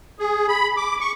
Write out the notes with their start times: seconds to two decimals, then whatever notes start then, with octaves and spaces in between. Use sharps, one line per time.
0.19 G#4
0.48 B5
0.77 D6
1.01 C#6